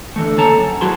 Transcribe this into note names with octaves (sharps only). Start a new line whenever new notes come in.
D3 E3 A3
C#3 A#3 A4 C#5 A5 A#5
F#2
F#3 E4 F#4 G#4 A5 C6